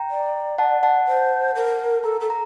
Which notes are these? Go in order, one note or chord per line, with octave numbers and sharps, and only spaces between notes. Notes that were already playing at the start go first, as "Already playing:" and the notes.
Already playing: G5 A#5
D5
F#5 A5
F#5 A5
C5
A#4
A4 A#5
A4
A#5